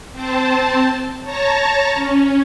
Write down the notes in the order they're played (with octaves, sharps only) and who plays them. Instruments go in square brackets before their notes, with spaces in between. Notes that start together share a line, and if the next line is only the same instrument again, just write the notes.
[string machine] C4 C5 A5
C#5 A5 A#5 A#6
C#4